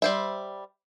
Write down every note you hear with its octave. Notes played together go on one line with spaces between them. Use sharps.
G3 C5 E5